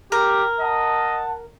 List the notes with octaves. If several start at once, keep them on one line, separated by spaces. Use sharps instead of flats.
G4 A#4
D#5 F#5 A5